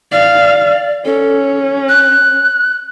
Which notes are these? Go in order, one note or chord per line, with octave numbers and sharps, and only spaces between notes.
D5 F5
C#4 A4
F#6